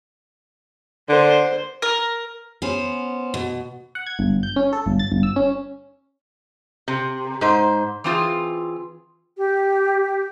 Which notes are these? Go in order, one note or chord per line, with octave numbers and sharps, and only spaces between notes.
D3 C5
A#4
B3 C#4 C5
B2
F#5
G#6
G1
G6
C#4
A4
G1
A6
G1
E6
C#4
C3
G#2 C5
E3 C4 F4 G#4
G4